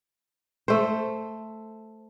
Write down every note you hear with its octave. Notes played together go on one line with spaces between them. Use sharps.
A3 C5